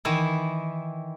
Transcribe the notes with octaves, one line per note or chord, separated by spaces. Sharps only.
D#3 E3 E4